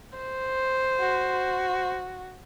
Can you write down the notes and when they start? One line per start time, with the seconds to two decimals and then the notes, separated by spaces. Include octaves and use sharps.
0.18 C5
1.00 F#4